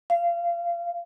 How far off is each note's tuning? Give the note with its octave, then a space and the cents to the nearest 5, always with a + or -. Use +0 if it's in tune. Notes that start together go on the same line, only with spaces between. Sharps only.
F5 -25